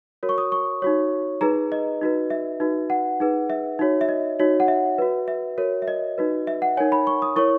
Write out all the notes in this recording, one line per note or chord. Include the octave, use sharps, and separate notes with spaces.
F#4 A#4 C#5
C#6
D#6
C#6
D#4 F#4 C#5
D#4 G#4 B4 A#5
D#5
D#4 F#4 B4
E5
D#4 F#4 B4
F#5
D#4 G#4 B4
E5
D#4 F#4 C#5
E5
D#5
D#4 F#4 C#5
F#5
E5
F#4 B4
E5
F#4 A#4 C#5
E5
D#5
D#4 F#4 B4
E5
F#5
D#4 A#4 C#5 G#5
B5
C#6
D#6
E4 A#4 C#5 C#6